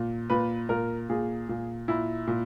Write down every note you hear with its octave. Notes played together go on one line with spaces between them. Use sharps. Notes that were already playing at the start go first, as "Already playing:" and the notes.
Already playing: A#2
A#2 B4
A#2 A#4
A#2 G#4
A#2
A#2 E4
A#2